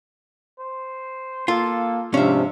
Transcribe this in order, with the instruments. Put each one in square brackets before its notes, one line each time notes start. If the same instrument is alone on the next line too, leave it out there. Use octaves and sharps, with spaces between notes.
[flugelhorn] C5
[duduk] A#3 [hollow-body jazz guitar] F4 [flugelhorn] A4
[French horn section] G#2 F3 D4 [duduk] C3 [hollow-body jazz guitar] C#4 E5 [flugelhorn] F5